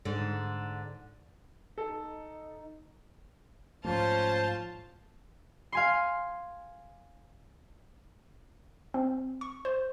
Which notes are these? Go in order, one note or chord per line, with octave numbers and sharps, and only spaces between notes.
G#2 D3
D#4 A4
G#2 F3 A3 C#4 F4 C5 A5
F5 G#5 C6
C4
C#6
C5